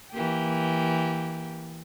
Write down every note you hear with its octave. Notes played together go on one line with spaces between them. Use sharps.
E3 A#3 G4